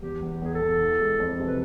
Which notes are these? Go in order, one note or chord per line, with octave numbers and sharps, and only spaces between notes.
E2 G4
E2
E2 G#4
A4
E2
E3
G#3
F2
C3
B4